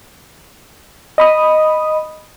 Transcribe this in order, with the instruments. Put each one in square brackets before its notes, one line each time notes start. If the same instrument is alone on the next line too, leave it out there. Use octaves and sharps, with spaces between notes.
[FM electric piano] D#5 B5 D#6